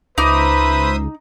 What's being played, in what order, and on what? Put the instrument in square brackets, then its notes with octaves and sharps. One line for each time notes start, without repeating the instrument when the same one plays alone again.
[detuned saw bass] C#2 [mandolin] D#4 D6 [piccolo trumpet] B4 [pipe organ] C5 E5 D#6